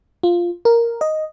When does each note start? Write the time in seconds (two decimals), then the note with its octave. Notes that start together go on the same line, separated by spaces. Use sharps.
0.23 F4
0.65 A#4
1.01 D#5